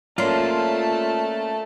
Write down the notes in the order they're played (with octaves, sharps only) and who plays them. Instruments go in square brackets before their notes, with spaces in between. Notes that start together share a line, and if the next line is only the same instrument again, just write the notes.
[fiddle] A3 A5 [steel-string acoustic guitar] A#3 C#4 D5 [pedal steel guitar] F4 C6